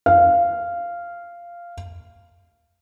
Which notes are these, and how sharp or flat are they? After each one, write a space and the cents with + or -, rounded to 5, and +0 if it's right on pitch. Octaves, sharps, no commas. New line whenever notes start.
F5 -10